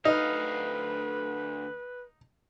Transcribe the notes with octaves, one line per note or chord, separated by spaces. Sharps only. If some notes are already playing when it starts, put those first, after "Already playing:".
D2 D#4 B4 F5